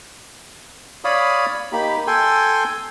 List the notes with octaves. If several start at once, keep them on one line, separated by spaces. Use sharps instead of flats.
C#5 D5 F5 B5 D#6
A#3 D#4 G4 B5
A4 G5 G#5 C6